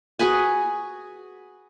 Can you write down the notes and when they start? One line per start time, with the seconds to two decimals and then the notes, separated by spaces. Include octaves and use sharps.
0.19 F#4 G#4 B4 G#5